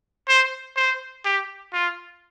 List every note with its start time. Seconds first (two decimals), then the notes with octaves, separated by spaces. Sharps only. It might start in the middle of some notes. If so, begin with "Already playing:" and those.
0.29 C5
0.76 C5
1.25 G4
1.73 F4